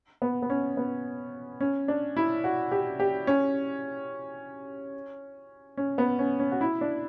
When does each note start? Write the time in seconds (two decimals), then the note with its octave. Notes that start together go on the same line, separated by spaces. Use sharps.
0.22 B3
0.42 B3
0.50 C#4
0.77 B3
1.60 C#4
1.88 D4
2.17 E4
2.44 F#4
2.72 G4
3.00 G4
3.27 C#4
5.77 C#4
5.98 B3
6.19 C#4
6.39 C#4
6.52 F#4
6.61 E4
6.81 D4